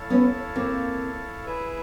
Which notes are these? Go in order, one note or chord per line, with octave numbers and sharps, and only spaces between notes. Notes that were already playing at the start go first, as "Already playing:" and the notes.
Already playing: E4 A4 C#5 F5 A5
B3 C#4
A#3 C4
E4 G#4 B4 E5